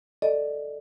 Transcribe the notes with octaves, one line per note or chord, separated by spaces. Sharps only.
A4 D5 D#5